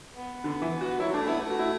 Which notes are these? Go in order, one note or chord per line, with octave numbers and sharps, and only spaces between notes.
B3
D3
E3
F#4
F#3 E4
A3 D4
B3 E4
A3
F#4
E4